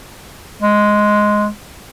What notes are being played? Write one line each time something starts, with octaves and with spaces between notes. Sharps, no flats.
G#3